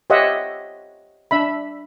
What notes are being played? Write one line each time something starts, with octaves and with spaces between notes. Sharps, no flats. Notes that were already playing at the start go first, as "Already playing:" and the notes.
G4 C5 C#5 D#5 E5 F#5
D4 E5 B5